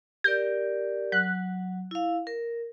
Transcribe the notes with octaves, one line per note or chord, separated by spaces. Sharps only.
G4 A#4 D5 G6
F#3 F#6
E4 F5
A#4